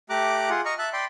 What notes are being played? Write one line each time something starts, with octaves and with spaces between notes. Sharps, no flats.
A3 G4 A#5 D6 F#6
F4 G#4 F#5
D#5 A#5 C#6 F6
E5 A5 F#6
D5 G5 B5 C6